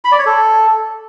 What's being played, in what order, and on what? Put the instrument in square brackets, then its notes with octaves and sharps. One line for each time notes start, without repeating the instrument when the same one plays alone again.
[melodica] B5
D5
C#5
A4